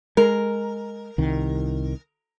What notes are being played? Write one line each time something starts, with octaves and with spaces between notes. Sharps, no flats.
G#3 A#4
C2 D#3